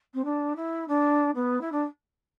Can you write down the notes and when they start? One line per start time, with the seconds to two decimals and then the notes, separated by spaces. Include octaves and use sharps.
0.14 C4
0.25 D4
0.56 E4
0.88 D4
1.35 B3
1.61 E4
1.72 D4